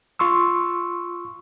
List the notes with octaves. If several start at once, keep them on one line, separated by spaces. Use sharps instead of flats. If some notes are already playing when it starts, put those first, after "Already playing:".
F4 C6 C#6 E6